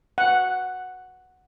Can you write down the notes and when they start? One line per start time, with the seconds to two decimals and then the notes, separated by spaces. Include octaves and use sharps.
0.18 F#5